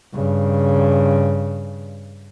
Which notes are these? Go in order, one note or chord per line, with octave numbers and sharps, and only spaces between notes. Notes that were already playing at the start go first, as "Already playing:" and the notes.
G2 C#3